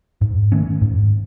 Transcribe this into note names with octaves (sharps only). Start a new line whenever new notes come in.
G#2
D#3 A3 C#4
G#2